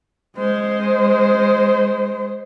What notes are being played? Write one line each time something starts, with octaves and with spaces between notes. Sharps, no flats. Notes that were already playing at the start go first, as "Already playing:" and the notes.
G#3 C5